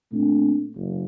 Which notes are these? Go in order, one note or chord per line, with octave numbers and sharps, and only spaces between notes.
A#2 A3 C4 D4
F#1